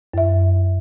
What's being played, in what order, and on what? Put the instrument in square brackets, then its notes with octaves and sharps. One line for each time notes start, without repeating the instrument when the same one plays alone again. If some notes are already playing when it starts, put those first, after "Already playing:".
[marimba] F#2 E5